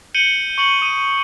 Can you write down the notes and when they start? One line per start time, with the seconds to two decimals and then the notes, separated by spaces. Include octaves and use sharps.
0.14 G6 C#7 D#7 F#7 G7
0.58 C#6 C#7 F#7
0.82 D#6 D#7